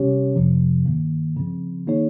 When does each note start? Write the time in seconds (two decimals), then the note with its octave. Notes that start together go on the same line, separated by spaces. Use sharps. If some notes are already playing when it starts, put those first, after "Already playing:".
Already playing: C3 G3 C#4 G4 C#5
0.36 F2 C3 F3
0.86 G2 D#3 A#3
1.37 C#3 F3 C4
1.86 D#3 A#3 D#4 G#4 C#5